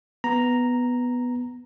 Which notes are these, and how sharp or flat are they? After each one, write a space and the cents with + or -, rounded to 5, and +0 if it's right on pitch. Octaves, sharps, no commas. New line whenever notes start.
B3 +0 A#5 +0